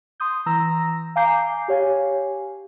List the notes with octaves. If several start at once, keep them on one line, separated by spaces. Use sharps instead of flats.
C6 D#6 G6
E3 A#5 E6 A#6
F5 G#5 A#5 D6 G6 C7
G4 C#5 F5 G#5